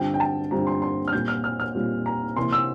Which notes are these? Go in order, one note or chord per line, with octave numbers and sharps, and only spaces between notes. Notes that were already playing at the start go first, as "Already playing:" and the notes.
Already playing: G2 D3 G3 C4 F4 G5
G5
A5
G2 D3 G3 C4 F4 A#5
C6
C6
F6
A#2 G3 C4 F4 G6
F6
F6
F6
A#2 G3 C4 F4
A#5
C3 E3 A#3 E4 C6
E6